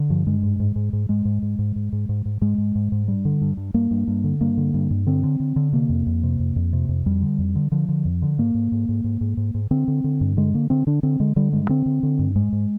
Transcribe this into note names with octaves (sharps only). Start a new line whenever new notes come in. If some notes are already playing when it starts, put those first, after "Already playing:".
Already playing: D3
G2 F3
G2 G#3
G#2
G#2
G#2
G#2
G#2 G#3
G#2
G#2
G#2
G#2
G#2
G#2
G#2
G#2 G#3
G#2
G#2
G#2
G2 G3
D3
G2
G2
G2 A#3
G2
G2
D3
G2 A#3
D3
G2
G2
D3 C4
D3
D3
D3
C3 A#3
F2
F2
C3
F2
F2
C3
F2
F2 G3
D3
F2
D3
D3 F3
D3
F2
D3
G#2 A#3
G#2
G#2
G#2
G#2
G#2
G#2
G#2
D3 C4
D3
D3
G2
D3 G#3
D3 A#3
D3 C4
D3 D4
D3 C4
D3 G#3
D3 G3
G2 G#3
D3 C4
D3
D3
G2
G#2 G#3
G#2